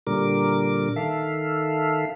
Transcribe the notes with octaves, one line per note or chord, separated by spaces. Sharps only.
A#2 D3 G3 A#4 D6
D#3 A4 E5 F5